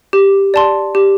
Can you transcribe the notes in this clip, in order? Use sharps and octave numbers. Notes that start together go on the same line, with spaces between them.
G4
D5 A5 C6
G4